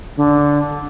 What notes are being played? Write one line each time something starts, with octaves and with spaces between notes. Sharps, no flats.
D3